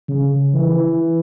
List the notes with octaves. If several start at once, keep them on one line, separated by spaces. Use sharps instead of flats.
C#3
E3
E3